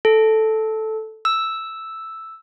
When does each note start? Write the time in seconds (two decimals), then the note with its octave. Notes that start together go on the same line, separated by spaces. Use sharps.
0.05 A4
1.25 E6